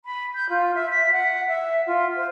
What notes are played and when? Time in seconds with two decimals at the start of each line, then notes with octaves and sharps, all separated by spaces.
0.05 B5
0.34 G6
0.49 F4
0.74 E5
0.90 B6
1.11 F#5
1.47 E5
1.86 F4
2.16 C5